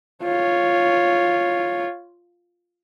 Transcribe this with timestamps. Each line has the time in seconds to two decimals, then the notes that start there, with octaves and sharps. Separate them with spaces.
0.23 F4 C#5